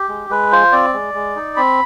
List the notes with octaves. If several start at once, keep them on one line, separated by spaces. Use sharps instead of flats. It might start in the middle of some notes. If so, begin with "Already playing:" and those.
Already playing: G4
G#3
G#3 B4
F4 C5
C4 D5
G#3
G#3
D#4
C4 B5